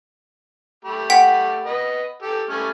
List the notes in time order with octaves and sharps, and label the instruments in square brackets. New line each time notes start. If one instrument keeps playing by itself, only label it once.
[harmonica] A3 G4 B5
[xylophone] F#5 G5 B6
[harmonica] B4 D#5
G4 A4
G3 A3 C#4